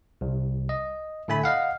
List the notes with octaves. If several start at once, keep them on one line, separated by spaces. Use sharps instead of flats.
C2
D#5
A2 D3 A3 G#5 B5
D#5 F5 F#5